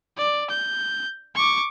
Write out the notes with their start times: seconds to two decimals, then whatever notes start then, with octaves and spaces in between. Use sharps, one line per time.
0.17 D5
0.50 G6
1.35 C#6 D6